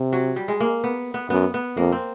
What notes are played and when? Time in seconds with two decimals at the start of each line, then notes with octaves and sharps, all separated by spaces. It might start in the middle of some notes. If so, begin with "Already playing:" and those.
Already playing: C3
0.13 F#3
0.36 G3
0.48 G#3
0.60 A#3
0.84 B3
1.14 B3
1.30 F#2 B3
1.54 B3
1.77 F2 A#3
1.92 C4